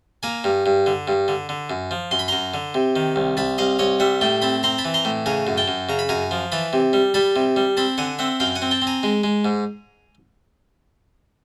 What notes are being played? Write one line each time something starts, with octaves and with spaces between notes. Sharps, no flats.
A#3 G#5 A#5
G2
G2
D3
G2
D3
D3
F#2
F3
F#2 C6
B5
F#2 A#5 C6
D3
C3
D#3
C2
C2 A5 B5
C2 D#5 F5
C2 C#5 D#5
G3 E5 F#5
A2 G5 A5
C4 A5 B5
C4 A#5 C6
A5 B5
E3
A#5 C6
A2
C#3 G#5 A#5
F#2
G5 A5
F#2
C#3 A#5
B5
F#2 G#5 A#5
F3
E3 A5 B5
C3
G3
G3 A5 B5
C3
G3
C4 A5 B5
D3 F#5 G#5
C4 E5 F#5
F#2 F5 G5
F#5 G#5
C4
G5 A5
C4
G#5 A#5
G#3
G#3
G#2